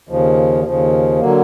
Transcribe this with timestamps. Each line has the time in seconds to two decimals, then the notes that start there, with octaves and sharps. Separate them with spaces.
0.09 D#2 C#3 F3
0.64 D#2 C#3 F3
1.20 D3 F#3 A#3